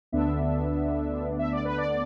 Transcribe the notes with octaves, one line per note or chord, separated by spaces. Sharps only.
D2 D3 B3 D4 E5
E5
D5
B4
D5